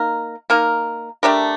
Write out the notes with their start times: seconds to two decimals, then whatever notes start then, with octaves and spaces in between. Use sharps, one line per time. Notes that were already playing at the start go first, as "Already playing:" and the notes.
Already playing: A#3 D#4 A#4
0.50 A#3 D#4 A#4
1.23 A3 D4 G4 A#4